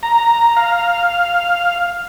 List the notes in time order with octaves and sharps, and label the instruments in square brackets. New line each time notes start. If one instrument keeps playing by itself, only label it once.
[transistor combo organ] A#5
F5